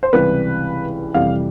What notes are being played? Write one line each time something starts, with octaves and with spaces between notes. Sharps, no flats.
C5
C#2 C3 E3 G3 B4
F2 C3 E3 G3 F5